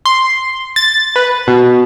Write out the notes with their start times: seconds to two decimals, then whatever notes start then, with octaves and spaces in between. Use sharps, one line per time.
0.05 C6
0.76 A6
1.16 B4
1.47 B2